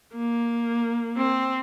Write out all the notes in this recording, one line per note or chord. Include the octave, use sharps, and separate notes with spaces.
A#3
C4